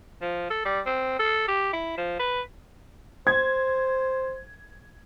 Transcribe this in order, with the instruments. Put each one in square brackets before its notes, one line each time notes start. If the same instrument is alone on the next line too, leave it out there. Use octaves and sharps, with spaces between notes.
[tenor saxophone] F3
A4
G3
C4
A4
G4
E4
F3
B4
[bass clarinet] C5 [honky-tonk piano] G#6